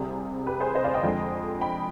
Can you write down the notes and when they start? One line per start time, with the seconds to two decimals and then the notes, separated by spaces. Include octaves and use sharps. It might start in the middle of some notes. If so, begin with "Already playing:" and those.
Already playing: C2 C3 G3 G#4
0.46 G4 B4
0.60 G#4 C5
0.75 C5 D#5
0.84 D5 F5
0.94 D#5 G5
1.03 F2 D3 G#3
1.61 G5 B5